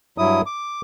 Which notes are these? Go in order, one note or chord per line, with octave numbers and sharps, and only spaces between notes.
G2 F#3 E4 D#6
D6